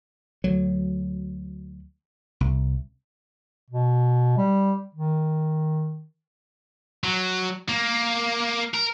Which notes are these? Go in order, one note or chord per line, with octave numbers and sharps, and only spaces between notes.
D2 F#3
C2
B2
G3
D#3
F#3
A#3
A#4